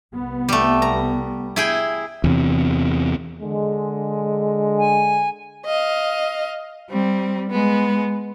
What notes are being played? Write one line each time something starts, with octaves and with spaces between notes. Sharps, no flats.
C2 B3
G3 A3
A#5
E4 G#4 G5
E2 C3
D3 G#3
G#5
D#5 F5
G3 C4
G#3 B3